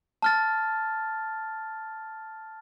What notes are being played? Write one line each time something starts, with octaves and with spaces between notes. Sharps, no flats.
A5 F6 A6